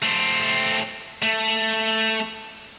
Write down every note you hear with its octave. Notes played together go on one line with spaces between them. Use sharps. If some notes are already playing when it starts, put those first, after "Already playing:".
A3 C4
A3